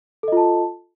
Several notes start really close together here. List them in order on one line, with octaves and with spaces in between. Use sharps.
A4 D#5 F4 A5